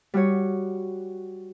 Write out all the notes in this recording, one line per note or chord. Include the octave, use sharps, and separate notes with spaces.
G3 F#4 C#5